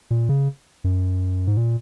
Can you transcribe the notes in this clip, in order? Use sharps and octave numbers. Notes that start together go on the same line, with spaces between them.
A#2
C#3
F#2
G#2
A#2